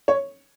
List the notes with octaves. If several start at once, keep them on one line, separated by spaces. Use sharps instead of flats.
C#5